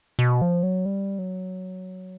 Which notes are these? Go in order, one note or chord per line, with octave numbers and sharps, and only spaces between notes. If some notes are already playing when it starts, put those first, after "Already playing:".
B2
F3
F#3
G3
F#3